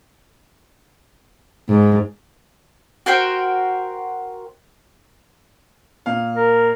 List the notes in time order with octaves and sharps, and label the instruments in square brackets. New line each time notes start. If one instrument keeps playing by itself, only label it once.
[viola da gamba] G#2
[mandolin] F#4 A#4 C5 G5
[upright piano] A#2 F5
[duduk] A#4